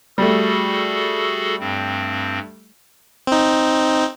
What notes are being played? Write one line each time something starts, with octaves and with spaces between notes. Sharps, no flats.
G3 A3 F#4 G#4 A4
G2 C4
C4 D#4